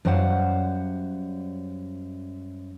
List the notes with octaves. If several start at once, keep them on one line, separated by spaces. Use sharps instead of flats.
F#2 G3 C5 F5 F#5